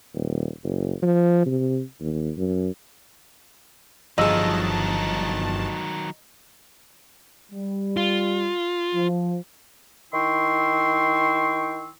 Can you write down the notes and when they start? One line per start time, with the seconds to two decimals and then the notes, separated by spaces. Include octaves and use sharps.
0.14 D#1
0.63 F#1
1.02 F3
1.46 C3
2.00 D#2
2.37 F#2
4.18 G1 D#3 F3 F#3 G#4 D#5 A5 E6
7.52 G3
7.97 F4
8.95 F3
10.13 D#3 E4 G5 C6 C#6 E6